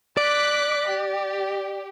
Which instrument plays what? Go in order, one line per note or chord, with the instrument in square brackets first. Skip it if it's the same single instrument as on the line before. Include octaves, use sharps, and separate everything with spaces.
[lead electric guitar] D5 [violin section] D6 F#6 B6
[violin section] G4